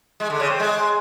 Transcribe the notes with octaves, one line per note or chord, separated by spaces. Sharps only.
G#3
D3
C#3
C4
G#3